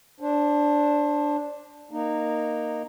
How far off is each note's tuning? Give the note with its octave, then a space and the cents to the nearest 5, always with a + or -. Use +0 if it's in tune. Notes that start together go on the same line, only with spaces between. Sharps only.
D4 +0 C5 +30
A#3 +0 D#4 -15